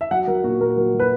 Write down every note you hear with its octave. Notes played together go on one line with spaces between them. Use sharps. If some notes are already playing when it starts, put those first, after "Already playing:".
E5
F#3 F#5
F#3 A#4
A#2 F#4
A#2 A#4
F#3 A#4
F#3
B4